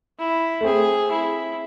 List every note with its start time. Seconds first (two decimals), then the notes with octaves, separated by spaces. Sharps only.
0.19 E4
0.61 A3
0.65 C4 G#4
1.11 E4